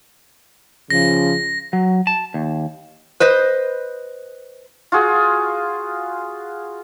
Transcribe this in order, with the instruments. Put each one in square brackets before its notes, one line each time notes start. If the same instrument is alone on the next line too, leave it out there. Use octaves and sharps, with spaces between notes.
[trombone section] C#3 F3 [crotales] A#6
[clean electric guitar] F#3
A5
D#2
[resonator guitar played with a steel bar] B4 C5 D#5
[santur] F4 F#4 G#4